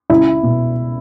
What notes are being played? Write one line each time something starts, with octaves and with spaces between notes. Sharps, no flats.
C#2 E4
B2